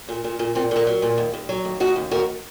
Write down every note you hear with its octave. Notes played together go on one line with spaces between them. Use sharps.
A#2
A#2
A#2
A#2 C4
A#2 A#3
F#3
A#2
D#2
D#2
F#3
D#2
C#3 D#4 F#4
D#2
D#2 F#4 A#4